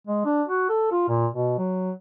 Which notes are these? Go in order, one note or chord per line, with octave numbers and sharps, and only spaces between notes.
G#3
D4
F#4
A4
F4
A#2
B2
F#3